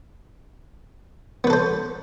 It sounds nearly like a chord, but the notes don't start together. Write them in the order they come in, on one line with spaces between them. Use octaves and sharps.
B3 B4 A4 C5